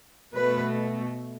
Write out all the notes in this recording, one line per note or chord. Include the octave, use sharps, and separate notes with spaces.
B2 A3 B4